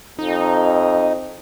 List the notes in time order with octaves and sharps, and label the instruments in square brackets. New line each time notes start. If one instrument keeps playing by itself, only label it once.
[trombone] F2 [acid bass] D#4